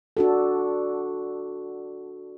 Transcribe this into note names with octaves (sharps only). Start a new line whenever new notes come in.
D4 F#4 A4